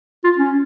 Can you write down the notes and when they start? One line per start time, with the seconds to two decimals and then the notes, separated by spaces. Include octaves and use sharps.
0.24 F4
0.38 C#4